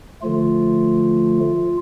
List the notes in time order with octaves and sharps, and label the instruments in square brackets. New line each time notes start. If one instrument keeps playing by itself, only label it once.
[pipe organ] D3 F3 A3 F4